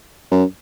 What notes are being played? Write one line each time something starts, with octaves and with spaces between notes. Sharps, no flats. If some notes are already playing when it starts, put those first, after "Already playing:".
F#2